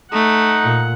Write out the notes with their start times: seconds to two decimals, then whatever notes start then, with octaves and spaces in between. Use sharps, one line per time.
0.13 A3 D#4 F#5
0.63 A#2